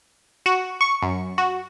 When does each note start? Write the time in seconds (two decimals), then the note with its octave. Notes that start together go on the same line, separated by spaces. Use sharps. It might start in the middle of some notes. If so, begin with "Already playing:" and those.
0.46 F#4
0.81 C#6
1.02 F#2
1.38 F#4